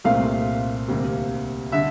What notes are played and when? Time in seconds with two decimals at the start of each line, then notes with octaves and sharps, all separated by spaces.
0.04 C2 A#2 A3 C4 F5
0.88 D2 C3 G3 A#3
1.72 D3 G3 E5